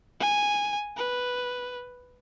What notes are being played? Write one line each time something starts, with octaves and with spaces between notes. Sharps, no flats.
G#5
B4